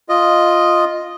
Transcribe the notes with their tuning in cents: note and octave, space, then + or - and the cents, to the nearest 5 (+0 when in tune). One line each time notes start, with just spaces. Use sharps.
F4 +0 D#5 +0